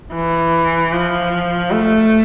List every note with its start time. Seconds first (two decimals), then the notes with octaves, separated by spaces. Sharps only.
0.14 E3
0.93 F3
1.71 A3